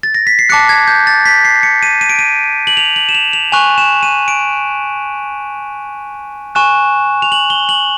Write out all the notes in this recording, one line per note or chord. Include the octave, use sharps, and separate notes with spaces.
A6
A#6
B6
C7
A5 D6 F#6 C#7
G#6
G6
A6
B6
C7
C#7
D#7
D#7
D7
D#7
F#7
F7
F#7
E7
F7
F7
G#5 C#6 F#6 F7
E7
D#7
D7
G#5 C#6 F#6 E7
F7
F#7
G7
F#7